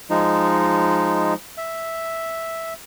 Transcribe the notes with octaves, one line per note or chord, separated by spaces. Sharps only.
F3 G#3 D#4
E5